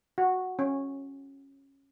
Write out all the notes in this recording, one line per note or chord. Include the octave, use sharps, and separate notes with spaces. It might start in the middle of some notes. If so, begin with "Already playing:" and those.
F#4
C#4